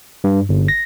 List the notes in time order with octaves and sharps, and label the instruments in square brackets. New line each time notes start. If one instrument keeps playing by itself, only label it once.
[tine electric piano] G2
G1
A#6